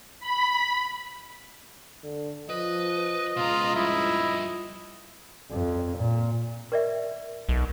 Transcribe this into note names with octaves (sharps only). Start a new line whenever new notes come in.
B5
D3
F3 B4 D#5
C#2 B2 F4 A#5
G2 F3 E4 D#5
F2
A#2
A#4 D5 E5
B1